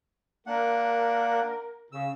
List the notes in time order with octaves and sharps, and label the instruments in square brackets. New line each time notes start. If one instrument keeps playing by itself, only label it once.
[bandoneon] A#3 D4 F#5 [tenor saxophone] A#4
[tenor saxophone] C#3 [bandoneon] E6